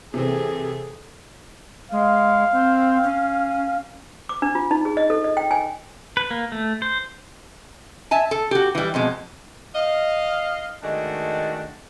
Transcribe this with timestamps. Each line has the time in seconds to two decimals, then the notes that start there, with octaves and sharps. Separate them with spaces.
0.14 C3 E3 C4 G#4 A4
1.92 G#3 F5
2.52 C4
3.03 C#4
4.29 D6
4.42 D4
4.55 F4
4.71 D#4
4.85 G#4
4.97 D#5
5.10 A4
5.24 D#5
5.37 G5
5.51 G#5
6.17 B4
6.31 A#3
6.52 A3
6.82 C5
8.11 E5 G#5 A5
8.31 A4
8.51 F#4 G4
8.75 E3 G3
8.94 F2 B2 G#3
9.74 D#5 F5
10.83 D#3 G#3 A3 D4 F#4